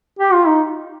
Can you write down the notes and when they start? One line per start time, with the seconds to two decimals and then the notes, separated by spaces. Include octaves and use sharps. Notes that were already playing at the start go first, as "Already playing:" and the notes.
0.19 G4
0.33 F4
0.47 D#4